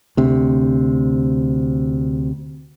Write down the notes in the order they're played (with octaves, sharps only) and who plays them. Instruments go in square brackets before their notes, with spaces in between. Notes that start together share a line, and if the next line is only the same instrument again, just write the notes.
[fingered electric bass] D2 C3